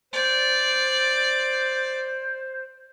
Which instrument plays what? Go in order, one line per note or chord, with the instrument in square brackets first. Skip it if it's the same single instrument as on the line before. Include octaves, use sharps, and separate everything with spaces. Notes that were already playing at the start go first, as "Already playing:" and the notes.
[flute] C5 [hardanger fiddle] D5